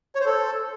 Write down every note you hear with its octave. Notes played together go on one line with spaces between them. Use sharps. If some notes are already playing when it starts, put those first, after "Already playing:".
C#5
C5
A4